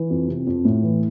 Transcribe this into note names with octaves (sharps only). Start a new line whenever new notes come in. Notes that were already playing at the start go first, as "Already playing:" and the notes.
Already playing: E3
F2
C3
F2
A2
E3